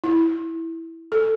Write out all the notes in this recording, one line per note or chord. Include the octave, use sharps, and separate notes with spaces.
E4
A4